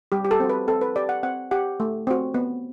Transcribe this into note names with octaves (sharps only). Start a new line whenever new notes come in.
G3 G4
G4
A4
C4 F#4
B4
C4 A4
B4
G4 D5
F#5
C4 F#5
G4 F#5
A3
C4 F#4
B3